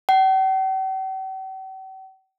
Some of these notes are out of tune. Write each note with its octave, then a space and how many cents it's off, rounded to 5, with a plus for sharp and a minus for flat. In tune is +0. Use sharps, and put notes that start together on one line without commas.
G5 -45